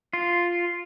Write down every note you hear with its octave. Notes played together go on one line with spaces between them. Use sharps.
F4